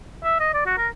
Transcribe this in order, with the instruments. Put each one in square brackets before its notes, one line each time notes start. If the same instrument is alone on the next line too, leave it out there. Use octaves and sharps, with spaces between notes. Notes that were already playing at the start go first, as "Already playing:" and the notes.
[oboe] E5
D#5
D5
F#4
A#4